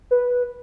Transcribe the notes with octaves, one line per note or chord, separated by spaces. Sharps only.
B4